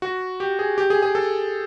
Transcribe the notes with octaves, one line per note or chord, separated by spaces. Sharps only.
F#4
G4
G#4
G4
G#4
G#4
A4